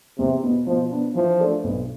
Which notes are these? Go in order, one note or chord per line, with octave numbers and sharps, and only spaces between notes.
E2 C3
B2 B3
B2 F3
B3 D4
E3 F3
A3 D4 A4 D5
B1